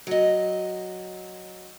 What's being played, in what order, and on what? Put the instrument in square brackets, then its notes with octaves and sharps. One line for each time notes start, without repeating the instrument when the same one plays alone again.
[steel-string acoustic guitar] F#3 D#5